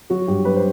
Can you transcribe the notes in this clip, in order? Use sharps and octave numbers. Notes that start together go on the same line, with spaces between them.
F#3 F#4
G2 G4
F#3 B4
C5